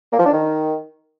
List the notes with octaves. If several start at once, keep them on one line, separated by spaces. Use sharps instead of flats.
A#3
F3
D4
D#3